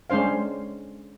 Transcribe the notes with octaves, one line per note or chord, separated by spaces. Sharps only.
G#3 C#4 D4 C5 F5